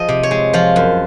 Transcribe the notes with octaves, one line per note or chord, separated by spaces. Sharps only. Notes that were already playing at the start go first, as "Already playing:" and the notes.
Already playing: F3 G#4 D#5
C3
C#5
G#3
F3 F4
F#2